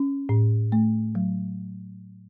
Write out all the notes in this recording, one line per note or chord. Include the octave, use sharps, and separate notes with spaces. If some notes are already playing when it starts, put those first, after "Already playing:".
Already playing: C#4
A2
A3
F#3